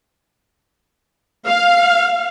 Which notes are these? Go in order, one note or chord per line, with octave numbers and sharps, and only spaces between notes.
F5